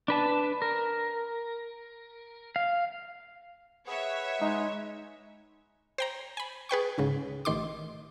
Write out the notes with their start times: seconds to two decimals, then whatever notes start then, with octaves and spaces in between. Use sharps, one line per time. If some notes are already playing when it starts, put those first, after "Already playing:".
0.08 D4 B4 A5
0.62 A#4
2.56 F5
3.87 G#4 B4 C#5 E5 F#5
4.42 G#3 D#4
5.98 C5 G5 A#5
6.37 G#5 B5
6.69 G#4 B4 G5 C#6
6.98 C#2 G#2 C#3
7.45 A1 D#3 C6 D6